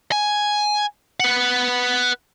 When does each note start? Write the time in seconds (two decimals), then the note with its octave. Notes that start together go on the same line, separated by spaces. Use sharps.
0.12 G#5
1.20 B4 F#5